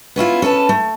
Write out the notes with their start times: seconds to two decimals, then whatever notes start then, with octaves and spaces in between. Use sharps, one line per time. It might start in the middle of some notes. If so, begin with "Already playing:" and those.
0.16 B3 C#4 E4 F4
0.42 C#4 A4 B4 A5
0.69 A3